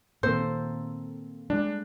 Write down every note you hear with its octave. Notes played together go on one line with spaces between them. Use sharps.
A#2 D#3 A#3 C4 A4 C5
G3 G#3 D4